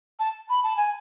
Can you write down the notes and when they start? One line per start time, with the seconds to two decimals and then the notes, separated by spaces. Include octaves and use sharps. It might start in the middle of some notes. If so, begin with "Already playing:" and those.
0.19 A5
0.49 B5
0.63 A5
0.77 G#5